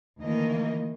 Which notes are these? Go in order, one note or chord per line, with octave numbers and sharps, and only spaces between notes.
D2 D#3 E3 A#3 D#5